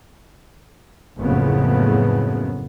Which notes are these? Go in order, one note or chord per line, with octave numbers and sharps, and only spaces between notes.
F#1 F2 A2 C#3 B3